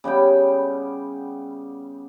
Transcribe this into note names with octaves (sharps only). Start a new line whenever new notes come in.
C#3 G3 B3 G5